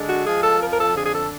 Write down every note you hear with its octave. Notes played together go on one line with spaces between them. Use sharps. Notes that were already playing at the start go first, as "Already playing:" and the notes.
Already playing: D3 G#3
F#4
F3 G#4
A4
F2 A#4
A#4
A4
D3 G#4
G#4
A4